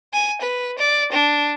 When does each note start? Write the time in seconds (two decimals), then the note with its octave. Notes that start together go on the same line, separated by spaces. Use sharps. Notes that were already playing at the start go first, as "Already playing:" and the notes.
0.14 G#5
0.42 B4
0.78 D5
1.12 D4